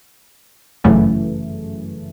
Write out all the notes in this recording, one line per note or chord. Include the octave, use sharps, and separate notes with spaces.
G1 F#2 C#3 E3 A3